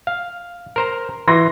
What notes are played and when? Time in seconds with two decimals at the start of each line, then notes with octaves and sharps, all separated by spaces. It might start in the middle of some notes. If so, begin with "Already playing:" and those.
0.07 F5
0.76 A#4 C5 A#5
1.28 E3 C6 A#6